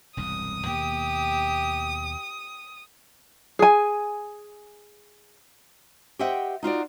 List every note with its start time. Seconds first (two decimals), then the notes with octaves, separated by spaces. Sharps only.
0.17 E1 C2 G2 D#6
0.66 D#2 B2 A#3 G4
3.59 G#4 G#5
6.19 G4 C5 D#5 E5 F#5 G5
6.63 D#4 F4 F#4 D5